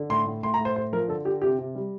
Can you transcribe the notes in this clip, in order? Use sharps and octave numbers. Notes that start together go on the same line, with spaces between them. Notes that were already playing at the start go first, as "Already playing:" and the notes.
Already playing: D3
A2 C6
A2
A2 C6
A#5
A2
C5
A2 C5
F3 A#4
D3 A4
D3 G4
C3 G4
C3
G3